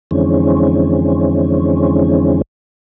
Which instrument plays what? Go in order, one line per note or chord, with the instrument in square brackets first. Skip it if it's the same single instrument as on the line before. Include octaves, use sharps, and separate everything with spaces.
[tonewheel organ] F2 D3 E3 G#3 C4 C#4